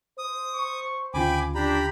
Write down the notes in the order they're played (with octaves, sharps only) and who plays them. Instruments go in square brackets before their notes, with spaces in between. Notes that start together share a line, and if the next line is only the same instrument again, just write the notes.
[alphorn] C5 [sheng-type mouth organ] D#6
[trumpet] C#6
[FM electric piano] D2 C#3 F4 [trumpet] G5 [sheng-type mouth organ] G#5 B5 D6
[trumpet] D4 [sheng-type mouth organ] G4 A#5 B5